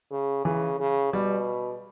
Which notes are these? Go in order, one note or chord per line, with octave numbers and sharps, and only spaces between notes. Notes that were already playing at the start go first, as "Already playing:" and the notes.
C#3
C#3 E3
C#3
B2 G3